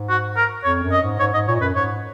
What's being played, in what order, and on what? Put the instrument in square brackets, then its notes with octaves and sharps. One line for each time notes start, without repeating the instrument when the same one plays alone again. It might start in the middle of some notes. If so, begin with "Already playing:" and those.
Already playing: [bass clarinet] G#2
[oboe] F#4
A#4
[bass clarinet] F2 [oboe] C#5
[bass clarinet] F#2
[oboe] D#5
[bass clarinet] G#2
[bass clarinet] G#2 [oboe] C#5
[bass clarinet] G#2 [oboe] D#5
[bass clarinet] A#2 [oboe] C#5
[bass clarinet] F#2 [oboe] B4
[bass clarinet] G#2 [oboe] C#5